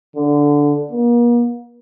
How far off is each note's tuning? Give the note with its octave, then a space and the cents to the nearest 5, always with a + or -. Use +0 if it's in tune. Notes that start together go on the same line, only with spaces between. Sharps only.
D3 -10
A#3 +40